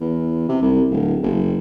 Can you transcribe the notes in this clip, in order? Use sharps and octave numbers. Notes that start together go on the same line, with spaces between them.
E2
C3
C2
D1
F#1